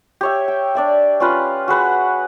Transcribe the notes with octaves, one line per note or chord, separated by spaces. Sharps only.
G4 C#5 E5
G5
D4 D5 E5
C#4 F4 B4
F#4 G#4 B4 F#5